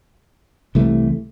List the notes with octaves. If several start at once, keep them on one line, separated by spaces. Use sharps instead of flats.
C2 C3 E3 A3